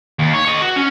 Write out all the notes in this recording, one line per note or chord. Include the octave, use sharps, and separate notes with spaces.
D#2
C#5
C#5 D#5
F#4
C#4